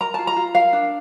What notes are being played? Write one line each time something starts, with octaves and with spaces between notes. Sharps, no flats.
A#4 A#5
F4 A5
A#5
F4
A#4 F5
D4